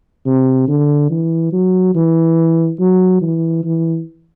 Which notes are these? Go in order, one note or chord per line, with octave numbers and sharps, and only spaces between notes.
C3
D3
E3
F#3
E3
F#3
E3
E3